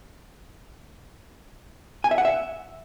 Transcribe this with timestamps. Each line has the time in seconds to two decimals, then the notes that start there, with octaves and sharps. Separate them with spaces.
2.04 G#5
2.11 E5
2.18 F#5
2.25 E5